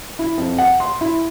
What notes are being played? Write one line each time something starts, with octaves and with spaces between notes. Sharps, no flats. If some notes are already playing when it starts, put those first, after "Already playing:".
E4
F2
F#5
C6
E4